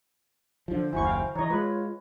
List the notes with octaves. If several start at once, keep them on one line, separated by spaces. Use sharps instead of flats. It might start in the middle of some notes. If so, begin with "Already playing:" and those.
D3 F3 C5
F#1 D#2 E4 F#4 G#5 C#6
F5 G5
E3 C#5 D#5 A#5
G#3 F4 B4 C#5